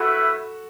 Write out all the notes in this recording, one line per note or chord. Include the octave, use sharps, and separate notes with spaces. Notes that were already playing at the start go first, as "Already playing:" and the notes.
Already playing: A3 E4 F#4 A4 B4 E5